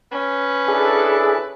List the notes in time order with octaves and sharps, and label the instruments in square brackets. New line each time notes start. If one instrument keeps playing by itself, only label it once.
[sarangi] C#4 [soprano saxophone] B4
[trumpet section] D4 E4 A4 [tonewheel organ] G#4